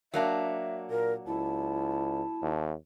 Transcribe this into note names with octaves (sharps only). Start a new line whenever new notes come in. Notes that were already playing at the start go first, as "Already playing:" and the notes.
F#3 A#3 D4 E5
A#2 A#4
C#2 E4 A5
D#2